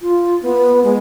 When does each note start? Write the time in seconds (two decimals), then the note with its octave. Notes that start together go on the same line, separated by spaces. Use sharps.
0.02 F4
0.43 B3
0.84 G#3